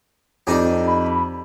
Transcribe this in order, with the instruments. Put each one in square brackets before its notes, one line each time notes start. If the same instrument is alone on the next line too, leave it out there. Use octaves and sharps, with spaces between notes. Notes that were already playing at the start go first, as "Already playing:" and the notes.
[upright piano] F2 [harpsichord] D4 D#4 G4
[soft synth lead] B5